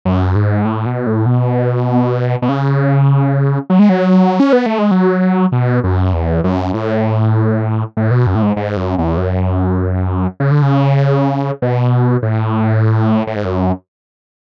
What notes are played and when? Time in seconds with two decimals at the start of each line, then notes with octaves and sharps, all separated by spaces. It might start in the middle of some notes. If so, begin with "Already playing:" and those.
0.05 F#2
0.35 G#2
0.65 A2
0.86 B2
1.07 A2
1.26 B2
2.42 B2
2.49 C#3
3.70 F#3
3.79 G#3
3.89 F#3
4.40 C#4
4.53 B3
4.66 A3
4.79 G#3
4.91 F#3
5.52 B2
5.84 F#2
6.13 E2
6.44 F#2
6.74 A2
7.97 A2
8.11 B2
8.27 F#2
8.35 A2
8.42 G#2
8.57 G#2
8.77 F#2
8.98 E2
9.17 F#2
10.40 C#3
10.51 D3
10.62 C#3
11.62 B2
12.23 A2
13.27 A2
13.36 G#2
13.45 F#2